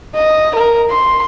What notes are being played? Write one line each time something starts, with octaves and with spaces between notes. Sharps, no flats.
D#5
A#4
C6